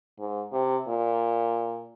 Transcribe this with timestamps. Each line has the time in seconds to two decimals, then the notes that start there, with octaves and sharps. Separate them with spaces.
0.19 G#2
0.53 C3
0.88 A#2